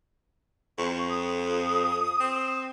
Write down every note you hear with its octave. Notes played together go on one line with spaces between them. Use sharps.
F2 C#6
D#6
C4